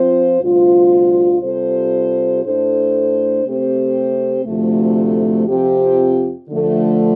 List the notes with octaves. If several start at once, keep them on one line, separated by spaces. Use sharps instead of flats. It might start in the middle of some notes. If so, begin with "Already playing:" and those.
Already playing: F3 C4 F4 C5
D2 C3 G3 F4 C5
C3 G3 F4 A4 C5
A2 A3 D4 A4 C5
C3 A3 C4 G4 C5
D2 C3 F3 A3
F2 C3 F3 C4 G4
D3 F3 A3